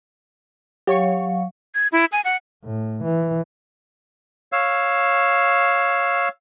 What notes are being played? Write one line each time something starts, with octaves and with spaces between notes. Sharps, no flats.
F#3 G4 C#5 F5 C#6
G#6
E4
G#5
F#5
A2
E3
C#5 F5 E6